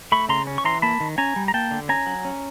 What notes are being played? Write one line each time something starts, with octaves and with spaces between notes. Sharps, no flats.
A3 B5 C#6
C#3 A#5 C6
C#4
C#6
E3 A#5 C6
A#3 A5 B5
D#3
C#4 G#5 A#5
G3
A#5
A#3 G5 A5
D3
C#4 G#5 A#5
F#3
C#4